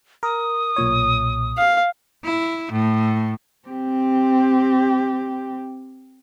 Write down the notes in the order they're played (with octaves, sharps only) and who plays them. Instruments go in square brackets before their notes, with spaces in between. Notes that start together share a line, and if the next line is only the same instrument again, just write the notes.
[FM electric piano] A#4 [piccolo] D#6
[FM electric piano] B1 A#2 C#5
[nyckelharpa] F5
[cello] E4
A2
C4 G4